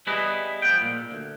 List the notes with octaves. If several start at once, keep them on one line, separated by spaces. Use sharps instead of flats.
G3 B3 E4 G#4 B4 D#5
F3 B3 G5
A#2
D2